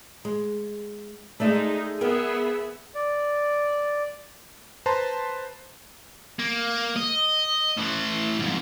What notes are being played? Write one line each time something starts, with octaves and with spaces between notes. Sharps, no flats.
G#3
G#3 A3 D#4 D5 E5
B3 G#4 A#4 E5 G5
D5
B4 C5 A5 A#5 C6
A#3
D#5
A2 E3
F2 G#2